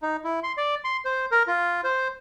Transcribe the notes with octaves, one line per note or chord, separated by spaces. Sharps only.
D#4
E4
C6
D5
C6
C5
A#4
F4
C5